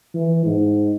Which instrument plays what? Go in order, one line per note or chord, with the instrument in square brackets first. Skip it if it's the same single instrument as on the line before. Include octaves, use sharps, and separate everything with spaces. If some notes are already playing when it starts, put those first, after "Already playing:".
[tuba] E3
G#2